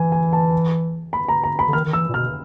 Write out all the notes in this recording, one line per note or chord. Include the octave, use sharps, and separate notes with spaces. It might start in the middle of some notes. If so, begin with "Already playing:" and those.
Already playing: E3 G#5
G#5
A5
B5
A#5
A#5
B5
D3
D#3 F6
D#3
E3 E6
A#2
B2 F6